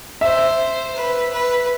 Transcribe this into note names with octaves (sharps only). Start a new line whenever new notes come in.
C5 E5
B4
B4